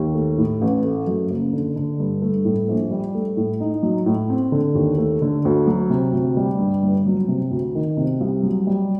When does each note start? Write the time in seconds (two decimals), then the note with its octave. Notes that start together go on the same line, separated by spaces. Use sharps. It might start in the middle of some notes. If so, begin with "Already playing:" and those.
Already playing: D#2
0.15 A3
0.38 A2
0.62 A1
0.84 A3
1.07 F#2
1.30 F#1
1.53 D3
1.76 D3
1.99 G2
2.22 A3
2.45 A2
2.68 A#1
2.91 G3
3.15 A3
3.37 A2
3.60 D#4
3.83 F#3
4.06 A2
4.30 C4
4.52 D3
4.75 D#2
4.98 A3
5.22 D3
5.45 D2
5.67 F#3
5.90 C3
6.13 D2
6.37 G3
6.59 G2
6.83 G1
7.06 F#3
7.28 C3
7.51 D2
7.75 D#3
7.97 C3
8.21 C2
8.43 F#3
8.67 G3